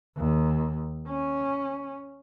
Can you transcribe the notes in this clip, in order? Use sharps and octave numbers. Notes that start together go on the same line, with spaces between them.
D#2
C#4